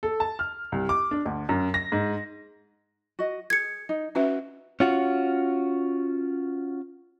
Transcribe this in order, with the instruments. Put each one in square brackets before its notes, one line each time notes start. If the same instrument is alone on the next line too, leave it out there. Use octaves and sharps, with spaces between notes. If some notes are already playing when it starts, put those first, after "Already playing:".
[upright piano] A4
A5
F6
C2
D6
D4
D2
F#2
A#6
G#2
[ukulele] F#4 D#5
[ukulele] G#4 [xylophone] G#6 C#7
[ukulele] D#4
[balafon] C#4 B4 E5 [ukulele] F#4
[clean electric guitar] C#4 F4 F#4